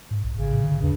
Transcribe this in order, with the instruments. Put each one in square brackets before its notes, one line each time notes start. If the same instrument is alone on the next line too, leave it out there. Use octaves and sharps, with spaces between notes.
[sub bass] G#2
B1
[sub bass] A1 [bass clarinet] C#3
[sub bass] A2
D3
[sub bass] E2 [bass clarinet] G2